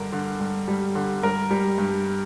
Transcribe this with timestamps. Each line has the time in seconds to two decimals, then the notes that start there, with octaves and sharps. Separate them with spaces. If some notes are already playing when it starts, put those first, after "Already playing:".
Already playing: G2 D3 A#4
0.12 D3
0.40 G2
0.68 G3
0.95 D3
1.23 G2 A#4
1.50 G3
1.78 G2